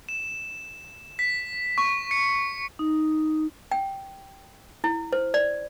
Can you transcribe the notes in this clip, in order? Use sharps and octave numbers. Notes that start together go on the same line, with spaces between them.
E7
B6
C#6
C#7
D#4
G5
E4
C5
D5